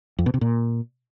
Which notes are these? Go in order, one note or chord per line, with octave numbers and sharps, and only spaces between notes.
F2
B2
C3
A#2